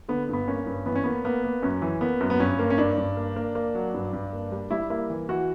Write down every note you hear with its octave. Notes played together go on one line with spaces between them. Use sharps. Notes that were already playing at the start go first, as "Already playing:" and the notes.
D3 B3
G2 B3
A#3 C#4
G2
E3 B3
C#4
A#3 B3
A#3 B3
A#3
F#2 C#4
E3
A#3 B3
F#2
B3
G2 C#4
A#3
C#4
G2 D4
G2
A#3
A#3
A#3
F#3
G2
G2
A#3
G3
G3 E4
A#3 E4
E3
E3 F#4